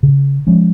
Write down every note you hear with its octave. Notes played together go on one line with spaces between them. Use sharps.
C#3
F3 G#3 C#4